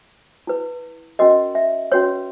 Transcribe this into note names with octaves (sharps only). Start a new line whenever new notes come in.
E4 B4
C#4 F#4 A#4 D#5
E5
C#4 F#4 B4 C#5